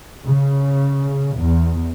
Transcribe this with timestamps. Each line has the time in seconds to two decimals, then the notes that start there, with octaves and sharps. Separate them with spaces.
0.25 C#3
1.38 E2